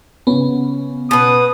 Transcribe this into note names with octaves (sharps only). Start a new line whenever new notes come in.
C#3 B3 C#4
B2 B4 D#6